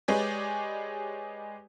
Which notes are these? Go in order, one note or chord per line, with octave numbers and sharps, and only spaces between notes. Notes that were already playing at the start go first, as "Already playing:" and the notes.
G#3 G4 G#4 B4 C#5 D5